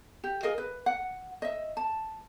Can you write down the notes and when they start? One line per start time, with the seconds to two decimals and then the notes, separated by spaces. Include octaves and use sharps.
0.24 G4
0.43 G#4 A#4 D#5 F5
0.58 B4
0.86 F#5
1.42 D#5 E5
1.77 A5